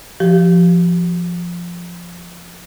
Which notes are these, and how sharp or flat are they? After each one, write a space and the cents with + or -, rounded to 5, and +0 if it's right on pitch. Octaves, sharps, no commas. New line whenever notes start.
F3 -5 G4 -25